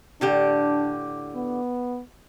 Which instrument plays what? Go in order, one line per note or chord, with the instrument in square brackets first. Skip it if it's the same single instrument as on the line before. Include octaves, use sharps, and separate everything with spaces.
[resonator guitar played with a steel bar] A2 D3 G4 [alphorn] D4
[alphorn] B3